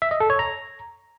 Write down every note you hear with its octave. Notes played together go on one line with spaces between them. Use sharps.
E5
D#5
A4
C#5
A#5